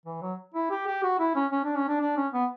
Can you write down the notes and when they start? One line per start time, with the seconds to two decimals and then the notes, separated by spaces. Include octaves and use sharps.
0.06 E3
0.22 F#3
0.54 E4
0.70 G4
0.87 G4
1.03 F#4
1.19 E4
1.35 C#4
1.51 C#4
1.64 D4
1.76 C#4
1.88 D4
2.00 D4
2.17 C#4
2.33 B3